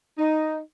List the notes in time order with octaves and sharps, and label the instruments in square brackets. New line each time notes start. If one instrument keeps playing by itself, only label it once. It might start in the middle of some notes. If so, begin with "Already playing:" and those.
[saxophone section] D#4